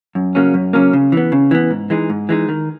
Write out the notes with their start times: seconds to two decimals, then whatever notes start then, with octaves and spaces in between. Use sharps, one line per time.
0.15 F#2
0.35 C#3 F#3 A#3 C#4
0.54 F#2
0.73 C#3 F#3 A#3 C#4
0.93 C#3
1.12 E3 B3
1.32 C#3
1.51 E3 B3
1.71 G#2
1.90 E3 G#3 D#4
2.10 G#2
2.29 E3 G#3 D#4
2.49 D#3